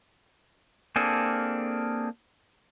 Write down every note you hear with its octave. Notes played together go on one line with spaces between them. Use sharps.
A#3 C4 D4 G#4 A4